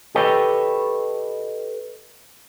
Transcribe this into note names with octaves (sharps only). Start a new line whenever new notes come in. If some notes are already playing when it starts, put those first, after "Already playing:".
G4 A4 B4 C#5 D#5 G5